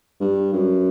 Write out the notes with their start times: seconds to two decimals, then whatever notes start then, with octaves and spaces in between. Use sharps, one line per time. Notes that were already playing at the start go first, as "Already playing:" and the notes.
0.20 G2
0.53 F#2